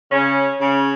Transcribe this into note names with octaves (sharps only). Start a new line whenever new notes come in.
C#3 C#4
C#3 C#4